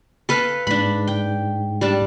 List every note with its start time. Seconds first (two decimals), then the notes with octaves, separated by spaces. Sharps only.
0.29 A4 B4 F5
0.67 G#2 D4 B5
1.08 G5
1.81 G3 D4 A5